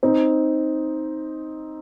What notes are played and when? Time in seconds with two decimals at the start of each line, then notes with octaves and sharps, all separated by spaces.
0.03 C4 D#4